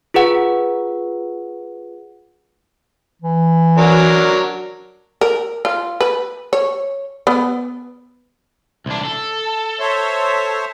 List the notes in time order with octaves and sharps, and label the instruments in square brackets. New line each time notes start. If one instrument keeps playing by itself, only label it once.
[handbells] F4 G#4 B4 F#5
[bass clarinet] E3
[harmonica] F#3 D4 A#4
[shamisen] A#4
F4
B4
C#5
B3
[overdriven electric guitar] C2 D4
A4
[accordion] C5 C#5 E5